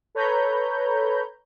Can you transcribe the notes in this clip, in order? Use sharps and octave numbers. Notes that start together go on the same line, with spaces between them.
A4 B4 C#5 A#5 B5 G6